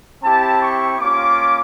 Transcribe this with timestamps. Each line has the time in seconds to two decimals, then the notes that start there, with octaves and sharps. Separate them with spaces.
0.23 C4 E4 G4 A5
0.62 C#6
1.00 A#3 C#4 F4 D6